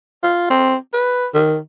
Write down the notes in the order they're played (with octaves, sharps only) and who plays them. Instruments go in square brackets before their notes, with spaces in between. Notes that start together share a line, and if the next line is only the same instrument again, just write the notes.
[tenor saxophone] F4
C4
B4
D#3